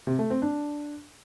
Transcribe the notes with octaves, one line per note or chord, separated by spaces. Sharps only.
C3
A3
C4
D4